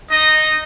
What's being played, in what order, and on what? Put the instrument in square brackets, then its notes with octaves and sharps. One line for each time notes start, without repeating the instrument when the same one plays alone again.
[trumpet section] D#4 D#5